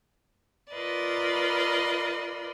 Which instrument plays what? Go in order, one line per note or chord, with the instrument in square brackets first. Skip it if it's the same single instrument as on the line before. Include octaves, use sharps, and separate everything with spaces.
[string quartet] F4 A#4 B4 D5 D#5